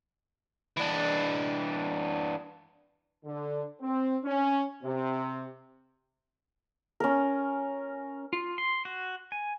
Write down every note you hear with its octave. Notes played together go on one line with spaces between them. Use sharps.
E3 D4
D3
C4
C#4
C3
C#4 A#4
F4
C6
F#4
G#5